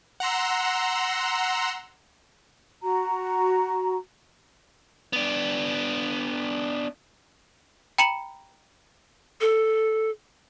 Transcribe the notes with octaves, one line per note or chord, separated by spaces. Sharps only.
F#5 A#5 C6 E6
F#4 A#5
B3 D4
G5 A#5 B5 C#7 E7 F#7
A4